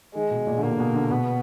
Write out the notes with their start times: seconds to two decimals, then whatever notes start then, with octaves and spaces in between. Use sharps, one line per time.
0.15 D#3 G#3
0.31 B2
0.47 A#2
0.58 D3
0.63 B2 A#3
0.71 D3
0.79 B2
0.95 D3
1.11 B2 B3